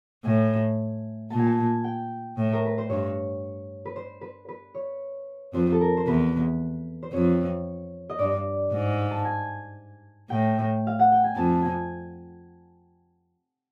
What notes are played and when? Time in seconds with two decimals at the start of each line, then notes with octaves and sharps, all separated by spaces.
0.24 A2 G#5
1.30 A#2 A5
1.39 G#5
1.46 A5
1.57 G#5
1.84 G5
2.37 A2
2.53 A#4
2.66 B4
2.78 C5
2.89 G2 C#5
3.85 B4
3.96 C5
4.21 B4
4.48 B4
4.75 C#5
5.54 F2 C5
5.72 A4
5.81 A#4
5.97 C5
6.07 E2 B4
7.03 C5
7.13 F2 C#5
8.09 D#5
8.19 G2 D5
8.72 G#2
9.11 A5
9.25 G#5
10.30 A2 G5
10.87 F5
10.99 F#5
11.12 G5
11.24 G#5
11.36 F2 A5
11.62 G#5